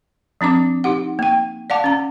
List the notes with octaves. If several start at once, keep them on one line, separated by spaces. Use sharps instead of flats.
F3 C4 D4 D6
D#4 G4 F#5
A#3 G5
D5 F5 F#5 A5 D6
C#4 A#5